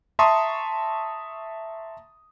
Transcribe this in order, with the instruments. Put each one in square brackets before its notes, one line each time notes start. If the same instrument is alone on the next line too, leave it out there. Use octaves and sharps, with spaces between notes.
[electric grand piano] E5 A5 A#5 C6 C#6 D#6